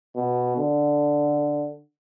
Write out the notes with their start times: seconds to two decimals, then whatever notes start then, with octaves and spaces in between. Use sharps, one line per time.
0.16 B2
0.58 D3